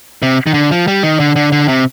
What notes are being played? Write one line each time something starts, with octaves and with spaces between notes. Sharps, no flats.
C3
D#3
D3
F3
G3
D#3
D3
D3
D3
C3